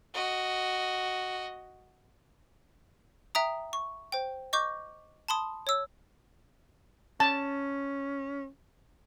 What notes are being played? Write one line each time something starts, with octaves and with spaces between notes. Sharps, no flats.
F#4 D#5
E5 G5 A#5 D#6
C#6
C5 G5
D#5 C#6 D6 G6
A5 B5 C6 D#6
C#5 E6
C#4 A5